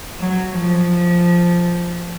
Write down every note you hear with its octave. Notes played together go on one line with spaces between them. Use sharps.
F#3
F3